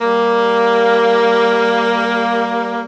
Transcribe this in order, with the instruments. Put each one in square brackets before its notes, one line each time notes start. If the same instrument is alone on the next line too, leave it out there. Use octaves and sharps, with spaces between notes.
[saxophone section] G3 A#3